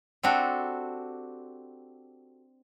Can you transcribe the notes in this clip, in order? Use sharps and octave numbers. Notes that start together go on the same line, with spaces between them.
C4 D4 F#4 G4 A4